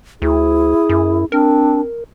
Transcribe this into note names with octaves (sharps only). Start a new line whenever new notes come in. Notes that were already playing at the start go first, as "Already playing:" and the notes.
D2 E4 G#4
F#2
C4 D4 A#4